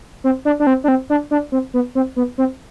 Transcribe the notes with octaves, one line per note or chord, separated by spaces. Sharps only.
C4
D4
D4
C4
D4
C4
D4
D4
C4
B3
C4
B3
C4